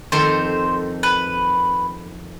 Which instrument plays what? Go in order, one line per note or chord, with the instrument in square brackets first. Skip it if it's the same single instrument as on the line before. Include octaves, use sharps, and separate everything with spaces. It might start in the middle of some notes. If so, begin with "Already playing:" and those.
[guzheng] F2 D#3 A4 [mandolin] C5
[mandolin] B4